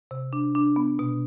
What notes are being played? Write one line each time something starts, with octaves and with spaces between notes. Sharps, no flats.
C3
D4
D4
B3
B2